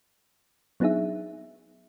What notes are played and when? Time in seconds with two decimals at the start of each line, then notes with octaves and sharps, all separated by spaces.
0.80 F#3 B3 D4 D#4 G#4 E5